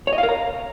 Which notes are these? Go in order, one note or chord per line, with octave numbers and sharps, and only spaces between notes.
C#5
D#5
F5
A#4
A#5